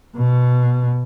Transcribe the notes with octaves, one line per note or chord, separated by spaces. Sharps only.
B2